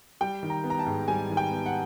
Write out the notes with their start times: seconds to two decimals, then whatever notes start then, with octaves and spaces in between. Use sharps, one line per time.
0.21 G3 G5
0.43 D#3
0.50 A#5
0.64 B3
0.70 A#5
0.79 A5
0.86 G#2
1.08 G3 G#5
1.30 D#3
1.37 G5
1.51 B3
1.66 F#5